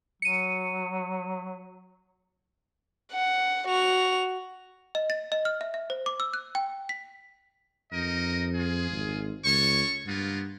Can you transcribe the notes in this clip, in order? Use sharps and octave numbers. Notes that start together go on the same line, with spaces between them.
F#3 C#7 D#7
F#5
F#4 F7
D#5
A6
D#5
F6
E5
E5
C5
D6
E6
F#6
G5
B6
F2 D#4 A#4 D#5
F4 G#4
G#1
C#2 A4 C#5 C#6
G2 A#3 B3 F4